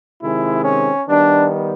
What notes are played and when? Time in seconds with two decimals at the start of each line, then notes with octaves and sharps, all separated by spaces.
0.22 C3 D#3 G#3 C4 E4
0.65 C#4
1.07 D#3 G3 B3 D4